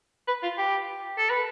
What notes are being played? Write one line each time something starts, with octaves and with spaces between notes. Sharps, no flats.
B4
F4
G4
A4
B4